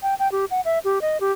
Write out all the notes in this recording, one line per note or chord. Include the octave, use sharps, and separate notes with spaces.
G5
G5
G4
F#5
E5
G4
D#5
G4